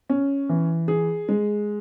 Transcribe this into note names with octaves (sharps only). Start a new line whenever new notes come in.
C#4
E3
G#4
G#3